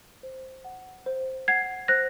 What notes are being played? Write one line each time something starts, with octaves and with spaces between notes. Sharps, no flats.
C5
F#5
C5
F#5 G#6 C7
C5 F#6 A#6